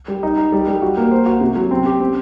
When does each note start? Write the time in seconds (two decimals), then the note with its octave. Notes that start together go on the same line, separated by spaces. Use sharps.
0.08 G3
0.23 D#4
0.37 D#4
0.52 G3
0.68 G3
0.82 F#4
0.97 A#3
1.12 C5
1.26 F#4
1.41 C3
1.56 F#3
1.71 C4
1.86 G4
2.00 C4